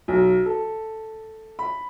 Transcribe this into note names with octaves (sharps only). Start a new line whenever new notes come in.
B1
A4
B5